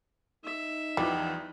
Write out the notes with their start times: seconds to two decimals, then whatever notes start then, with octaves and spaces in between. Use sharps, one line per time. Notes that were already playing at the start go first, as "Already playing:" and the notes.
0.44 D#4 E5
0.97 E2 E3 F3 G3